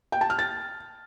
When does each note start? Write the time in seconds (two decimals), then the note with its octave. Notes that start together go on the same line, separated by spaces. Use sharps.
0.12 G5
0.21 A5
0.30 F6
0.39 A6